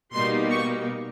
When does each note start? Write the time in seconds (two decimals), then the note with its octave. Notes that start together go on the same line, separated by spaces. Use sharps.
0.13 B2 G3 A#3 D#4 C6
0.50 C#6